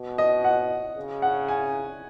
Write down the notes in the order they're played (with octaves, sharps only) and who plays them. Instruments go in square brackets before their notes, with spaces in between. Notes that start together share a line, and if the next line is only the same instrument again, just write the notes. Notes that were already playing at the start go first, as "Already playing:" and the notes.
Already playing: [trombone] B2
[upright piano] D#5
F#5
[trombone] C#3
[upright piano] F#5
G#5